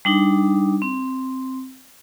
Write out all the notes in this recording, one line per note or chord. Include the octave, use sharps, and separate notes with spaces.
G3 D4 D#4
C4